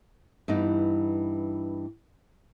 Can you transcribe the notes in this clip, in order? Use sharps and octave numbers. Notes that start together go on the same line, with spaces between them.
G2 E3 B3 D#4